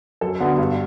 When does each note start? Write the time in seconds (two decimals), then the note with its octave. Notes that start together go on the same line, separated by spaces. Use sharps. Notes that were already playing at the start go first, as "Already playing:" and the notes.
0.21 F#2 A4
0.40 D3 F#3 B3
0.58 G2